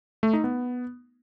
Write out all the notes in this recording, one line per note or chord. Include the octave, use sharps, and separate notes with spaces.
A3
D#4
B3